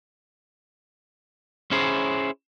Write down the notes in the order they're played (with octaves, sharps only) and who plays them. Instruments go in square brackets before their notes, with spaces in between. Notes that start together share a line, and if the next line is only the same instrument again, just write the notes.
[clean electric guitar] C#4 E4 G#4 C5